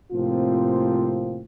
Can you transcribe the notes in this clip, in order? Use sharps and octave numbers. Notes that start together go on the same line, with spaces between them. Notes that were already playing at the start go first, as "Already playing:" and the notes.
A2 C3 F3 A#3 C4 F4